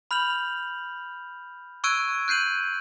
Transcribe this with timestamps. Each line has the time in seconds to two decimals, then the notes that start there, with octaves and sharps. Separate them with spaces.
0.11 B5 F6 G6 F7 F#7
1.84 C#6 E6 F#6 G#6 D7 D#7
2.28 F#6 G6 C7 D#7 F#7